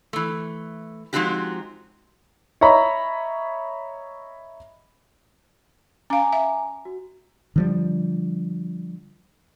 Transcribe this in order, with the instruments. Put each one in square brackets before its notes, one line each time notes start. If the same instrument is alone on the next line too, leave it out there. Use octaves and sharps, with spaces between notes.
[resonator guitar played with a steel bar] E3 A3
F3 G#3 C4 D#4 F#4 G4
[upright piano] C#5 D#5 E5 A#5 B5 C#6
[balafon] C#4 F5 [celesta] G#5 A#5 D6
[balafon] E5
[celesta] F#4
[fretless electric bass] D3 F3 G3